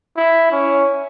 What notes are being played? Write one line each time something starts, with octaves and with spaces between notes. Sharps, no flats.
E4
C#4